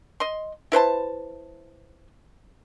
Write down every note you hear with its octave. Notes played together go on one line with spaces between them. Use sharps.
D#5 C6
E4 B4 C5 A5